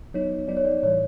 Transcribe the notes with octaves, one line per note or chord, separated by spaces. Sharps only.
F#3 B3 D#4 C#5
F#3 B3 D#4 D5
C#5
D5
A2 E3 G3 C#5